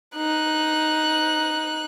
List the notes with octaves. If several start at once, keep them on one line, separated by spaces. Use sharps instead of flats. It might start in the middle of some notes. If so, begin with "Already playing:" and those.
D#4 F#6